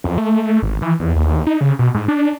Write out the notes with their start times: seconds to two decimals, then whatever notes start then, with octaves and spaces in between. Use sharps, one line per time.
0.04 F2
0.18 A3
0.62 G#1
0.82 E3
1.00 E2
1.16 D#2
1.47 D#4
1.61 C#3
1.79 B2
1.94 G#2
2.08 D4